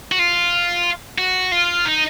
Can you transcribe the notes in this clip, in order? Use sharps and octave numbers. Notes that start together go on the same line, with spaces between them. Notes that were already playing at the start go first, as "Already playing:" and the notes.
F#4
F4
F#4
F4
D#4